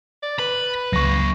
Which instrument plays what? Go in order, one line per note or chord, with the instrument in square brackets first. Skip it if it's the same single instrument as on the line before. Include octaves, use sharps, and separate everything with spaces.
[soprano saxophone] D5
[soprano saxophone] B4 [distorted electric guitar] B5
[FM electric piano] C#2 [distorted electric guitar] F#3 A#3 [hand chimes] C#6 A#6